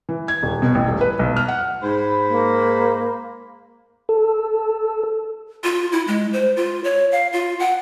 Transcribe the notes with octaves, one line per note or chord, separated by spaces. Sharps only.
E3
G#6
D#1
B2
A1
D#1
B4
B1
F6
F#5
G#2 C5 B5
A#3
A4
F4
E4
G#3
C5
F4
C#5
F5
F4
F#5